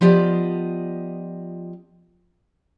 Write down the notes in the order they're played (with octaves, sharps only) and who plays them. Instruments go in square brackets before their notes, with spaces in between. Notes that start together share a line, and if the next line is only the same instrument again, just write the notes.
[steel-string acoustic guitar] F3 B3 F4 G4 D5 D#5